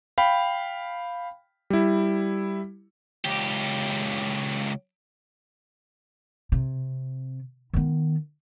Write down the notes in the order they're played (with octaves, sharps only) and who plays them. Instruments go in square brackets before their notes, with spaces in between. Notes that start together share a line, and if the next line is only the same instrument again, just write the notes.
[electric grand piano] F5 G5 B5
G3 E4
[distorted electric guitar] C#2 G4
[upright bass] C3
D#3 B3